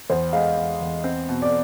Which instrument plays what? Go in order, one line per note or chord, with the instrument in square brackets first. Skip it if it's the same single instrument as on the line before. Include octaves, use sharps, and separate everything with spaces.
[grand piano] E2 [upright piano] C5
[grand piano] G#3 [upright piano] D#5 F5
[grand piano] E2
E2
C4
B2
[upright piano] D5